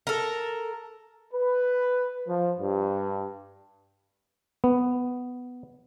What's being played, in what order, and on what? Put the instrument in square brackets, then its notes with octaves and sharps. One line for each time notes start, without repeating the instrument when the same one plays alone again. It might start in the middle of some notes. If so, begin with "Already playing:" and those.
[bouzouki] A4 A#4
[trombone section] B4
F3
G2
[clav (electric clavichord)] B3